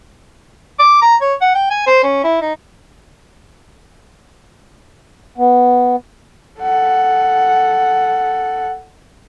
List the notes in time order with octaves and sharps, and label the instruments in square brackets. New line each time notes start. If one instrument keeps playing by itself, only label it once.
[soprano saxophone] D6
A#5
C#5
F#5
G5
G#5
C5
C#4
E4
D#4
[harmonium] B3
[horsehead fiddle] A4 F#5